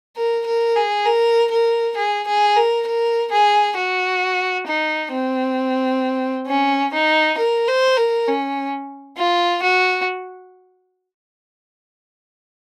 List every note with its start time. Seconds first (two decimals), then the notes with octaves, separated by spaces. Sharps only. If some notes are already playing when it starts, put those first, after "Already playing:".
0.16 A#4
0.46 A#4
0.76 G#4
1.05 A#4
1.51 A#4
1.96 G#4
2.27 G#4
2.56 A#4
2.86 A#4
3.31 G#4
3.76 F#4
4.67 D#4
5.13 C4
6.47 C#4
6.93 D#4
7.38 A#4
7.67 C5
7.97 A#4
8.28 C#4
9.17 F4
9.63 F#4